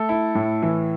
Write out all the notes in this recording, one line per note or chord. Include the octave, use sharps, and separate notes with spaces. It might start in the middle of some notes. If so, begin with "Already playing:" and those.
Already playing: A3 A4
E4
A2
E3